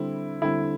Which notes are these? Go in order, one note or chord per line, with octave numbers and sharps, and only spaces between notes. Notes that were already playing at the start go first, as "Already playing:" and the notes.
Already playing: D3 G3 C4 E4
D3 G3 C4 E4